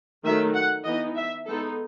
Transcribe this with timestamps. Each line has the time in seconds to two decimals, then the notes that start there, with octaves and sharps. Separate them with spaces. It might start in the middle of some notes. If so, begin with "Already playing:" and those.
0.24 D#3 F#3 A3 E5
0.54 F#5
0.85 E3 B3 D#4 D#5
1.16 E5
1.47 G#3 B3 D#4 A4